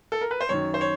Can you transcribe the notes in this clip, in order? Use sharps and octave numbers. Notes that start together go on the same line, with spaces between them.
A4
A#4
B4
C5
F#2 D#3 C#5
C5
C#5